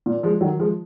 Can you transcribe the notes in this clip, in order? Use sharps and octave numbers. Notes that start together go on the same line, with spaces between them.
A#2
F3 G#3
D#3 F#3
F3 G#3